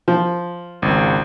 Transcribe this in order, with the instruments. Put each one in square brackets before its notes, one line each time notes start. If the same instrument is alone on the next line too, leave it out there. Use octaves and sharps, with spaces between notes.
[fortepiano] F3
[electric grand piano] G#1 C#2